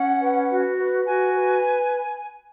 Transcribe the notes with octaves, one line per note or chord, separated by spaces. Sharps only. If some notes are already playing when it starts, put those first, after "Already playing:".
Already playing: C#4 F#5
B4
F#4
B4
F#4 G#5
B4